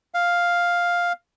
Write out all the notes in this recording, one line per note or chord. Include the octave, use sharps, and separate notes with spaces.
F5